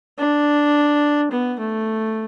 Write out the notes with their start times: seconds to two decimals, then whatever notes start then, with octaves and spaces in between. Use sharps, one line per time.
0.19 D4
1.31 B3
1.60 A3